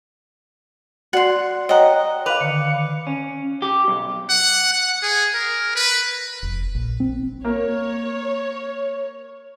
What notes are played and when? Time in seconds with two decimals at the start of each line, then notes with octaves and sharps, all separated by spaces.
1.13 F#4 D5 F#5 C6
1.69 C#5 D#5 F#5 G5 A#5
2.26 B4 F5 D6 F7
2.41 D3 D#3 C#7
3.07 C#4
3.62 G4
3.88 B1
4.30 F#5
4.73 F#5
5.03 G#4
5.35 A#4
5.76 B4
6.43 F1
6.75 A#1
7.00 C4
7.44 A#3 C#5